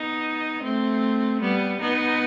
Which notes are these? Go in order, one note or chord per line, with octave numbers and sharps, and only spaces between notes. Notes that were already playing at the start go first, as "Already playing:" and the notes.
Already playing: B3 D#4
A3 C4
G3 B3
B3 D#4